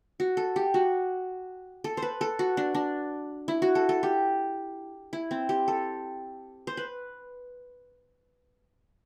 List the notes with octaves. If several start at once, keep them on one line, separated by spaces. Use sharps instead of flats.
F#4
A4
G4
F#4
A4
C5
B4
A4
F#4
D4
D4
E4
F#4
A4
A4
G4
E4
C4
G4
A4
C5
B4